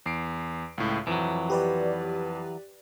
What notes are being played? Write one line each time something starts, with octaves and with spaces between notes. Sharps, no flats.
E2 C7 D7
C#2 A2
F2 E3 F#3
G4 B4 D5